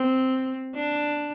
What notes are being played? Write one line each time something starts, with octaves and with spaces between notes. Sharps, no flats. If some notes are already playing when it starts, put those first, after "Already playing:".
Already playing: C4
D4